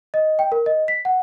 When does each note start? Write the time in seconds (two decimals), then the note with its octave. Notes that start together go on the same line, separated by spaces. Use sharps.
0.14 D#5
0.39 G5
0.52 A#4
0.66 D#5
0.88 B6
1.05 F#5